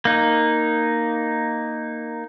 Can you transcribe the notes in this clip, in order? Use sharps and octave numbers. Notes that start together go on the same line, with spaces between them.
A#3 D#4